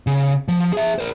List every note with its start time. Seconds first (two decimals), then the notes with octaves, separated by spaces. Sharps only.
0.07 C#3
0.48 F3
0.73 G#4 E5
0.98 A#4 C5